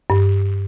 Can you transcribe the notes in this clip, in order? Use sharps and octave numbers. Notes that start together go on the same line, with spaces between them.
G2